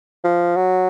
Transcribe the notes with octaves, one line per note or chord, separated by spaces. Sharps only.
F3
F#3